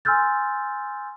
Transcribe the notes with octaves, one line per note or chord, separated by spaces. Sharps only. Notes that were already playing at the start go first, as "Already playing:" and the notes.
G#5 C6 E6 F6 G6 A6